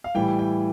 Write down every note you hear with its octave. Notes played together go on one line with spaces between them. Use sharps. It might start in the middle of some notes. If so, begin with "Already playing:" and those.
F5
A2 E3 G3 G5
G5